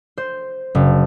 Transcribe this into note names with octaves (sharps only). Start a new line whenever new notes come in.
C5
F#1